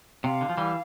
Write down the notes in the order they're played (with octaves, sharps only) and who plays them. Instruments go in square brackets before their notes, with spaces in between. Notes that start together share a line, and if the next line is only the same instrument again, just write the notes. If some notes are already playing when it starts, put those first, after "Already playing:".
[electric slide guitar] C3 [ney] F5
[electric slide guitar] D3
F3
E3 G3